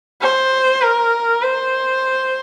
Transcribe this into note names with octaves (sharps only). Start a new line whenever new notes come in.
C5
A#4
C5